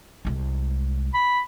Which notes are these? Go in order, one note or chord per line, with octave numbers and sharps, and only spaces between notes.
C2 G#3
B5